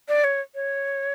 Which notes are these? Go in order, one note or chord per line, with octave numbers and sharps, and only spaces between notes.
D5
C#5
C#5